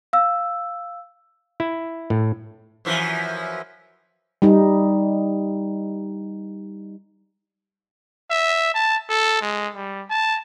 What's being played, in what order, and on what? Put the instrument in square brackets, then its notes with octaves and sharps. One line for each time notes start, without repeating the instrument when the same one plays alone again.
[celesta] F5 E6
[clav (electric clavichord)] E4
A2
[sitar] F#2 E3 F3
[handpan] G3 D#4
[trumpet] E5
A5
A4
G#3
G3
A5